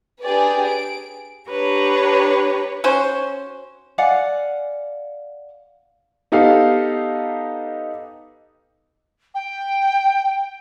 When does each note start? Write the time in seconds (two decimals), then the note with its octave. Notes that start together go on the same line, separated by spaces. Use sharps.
0.22 D4 G4 G#4 B4 D5
0.67 D7
1.50 D4 G4 B4 C#5 A#5
2.84 C#4 F#4 C5
3.98 D5 F5 F#5 G#5
6.32 B3 D#4 G4 A4 F5
9.34 G5